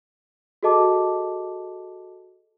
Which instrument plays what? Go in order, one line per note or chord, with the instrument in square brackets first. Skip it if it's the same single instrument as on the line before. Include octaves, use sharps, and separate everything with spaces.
[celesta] F#4 G#4 A4 D#5 A5 D6